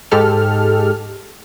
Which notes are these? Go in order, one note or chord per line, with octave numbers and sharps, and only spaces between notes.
G#2 G#3 G4 A4 F6